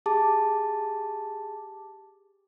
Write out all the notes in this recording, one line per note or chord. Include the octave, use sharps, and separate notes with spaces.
G4 G#4 A5 D6